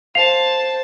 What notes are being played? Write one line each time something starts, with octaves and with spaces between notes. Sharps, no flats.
C5 F5 A5 C7 F7